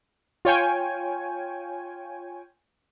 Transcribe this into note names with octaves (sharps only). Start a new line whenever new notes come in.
F4 C#5 G5 G#5